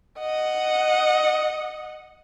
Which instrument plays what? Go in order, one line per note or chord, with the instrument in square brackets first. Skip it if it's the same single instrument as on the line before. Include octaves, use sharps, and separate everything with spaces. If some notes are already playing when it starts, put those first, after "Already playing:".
[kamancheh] D#5 F#5